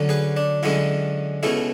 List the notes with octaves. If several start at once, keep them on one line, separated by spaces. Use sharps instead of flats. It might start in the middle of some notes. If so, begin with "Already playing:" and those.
Already playing: D2 D3 F#3 C#4
G#4 B4
D4
F#2 D3 G#3 C#4 E4
C#2 B2 A3 C#4 E4 G#4